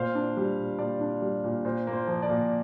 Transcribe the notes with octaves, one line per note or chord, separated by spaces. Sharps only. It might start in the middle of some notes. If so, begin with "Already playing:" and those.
Already playing: A#2 C5 F5
D4
G3
A#2
A#2 D5
D4
G3
A#2
A#2 C5
A#3
C5
F3
D5
A#2